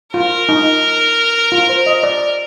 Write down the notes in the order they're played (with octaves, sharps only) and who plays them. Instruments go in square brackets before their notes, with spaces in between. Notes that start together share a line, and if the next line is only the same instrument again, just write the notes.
[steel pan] F4 [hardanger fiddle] A#4
[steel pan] D#4
F4
C5
D#5
D5